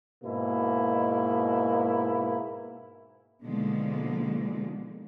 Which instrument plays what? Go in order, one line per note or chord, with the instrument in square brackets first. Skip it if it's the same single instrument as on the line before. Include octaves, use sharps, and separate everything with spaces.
[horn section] G#2 B2 A#3 E4
[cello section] B2 D3 D#3 F3 G#3 A#3